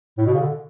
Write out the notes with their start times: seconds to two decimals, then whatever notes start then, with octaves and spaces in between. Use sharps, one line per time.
0.18 A2
0.26 B2
0.34 C#3
0.40 D3